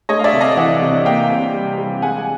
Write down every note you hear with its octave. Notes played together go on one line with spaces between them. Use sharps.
A3 C#5 D#5
F5
D5 E5
C3
D#5 F5
E3 E5 F#5
C3
A#3 F5 G5
C3
G3
G3
G#3 F#5 G#5